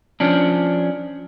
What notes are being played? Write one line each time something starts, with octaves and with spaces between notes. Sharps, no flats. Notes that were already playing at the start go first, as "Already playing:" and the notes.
F3 C#4 D4